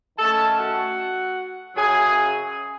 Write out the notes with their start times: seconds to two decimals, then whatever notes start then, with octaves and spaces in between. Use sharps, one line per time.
0.17 D#3 A3 C#4 A4 A5
0.58 F#4 F#5
1.75 F#2 C#3 F#3 G#4 G#5